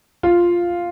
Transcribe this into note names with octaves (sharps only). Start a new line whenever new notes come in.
F4